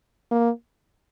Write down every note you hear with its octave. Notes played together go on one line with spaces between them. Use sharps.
A#3